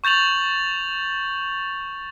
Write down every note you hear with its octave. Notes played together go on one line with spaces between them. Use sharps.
C#6 G6 A6 F7 F#7